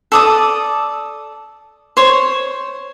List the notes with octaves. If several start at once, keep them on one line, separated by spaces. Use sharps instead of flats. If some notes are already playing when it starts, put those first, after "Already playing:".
A4 D5 D#6
C5 C#5